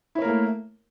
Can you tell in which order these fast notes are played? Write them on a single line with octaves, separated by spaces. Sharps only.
E4 C#5 A#4 A#3 A3